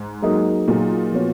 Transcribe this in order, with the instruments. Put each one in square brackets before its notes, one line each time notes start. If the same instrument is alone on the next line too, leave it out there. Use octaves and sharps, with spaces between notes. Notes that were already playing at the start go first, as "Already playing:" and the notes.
Already playing: [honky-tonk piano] G#2
[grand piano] F#3 A#3 D#4 G#4
[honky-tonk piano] A#2 [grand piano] F#3 A#3 D#4 G#4
[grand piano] F3 B3 F#4 C#5